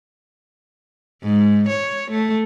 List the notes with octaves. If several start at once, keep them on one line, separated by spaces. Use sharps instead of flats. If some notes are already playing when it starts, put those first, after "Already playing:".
G#2
C#5
A3